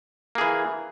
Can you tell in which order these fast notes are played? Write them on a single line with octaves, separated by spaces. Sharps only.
A#3 G#4 E3